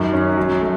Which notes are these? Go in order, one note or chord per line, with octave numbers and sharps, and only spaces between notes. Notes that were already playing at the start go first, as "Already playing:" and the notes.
Already playing: F#2 D#3
C#4
F#3
A3